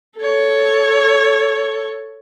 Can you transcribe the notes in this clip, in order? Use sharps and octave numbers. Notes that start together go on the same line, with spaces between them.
A4 C#5